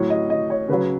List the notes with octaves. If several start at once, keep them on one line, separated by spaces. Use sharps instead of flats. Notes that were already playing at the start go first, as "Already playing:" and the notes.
Already playing: A2 F#3 C#5
D#5
D#5
C#5
C#3 F#3 B4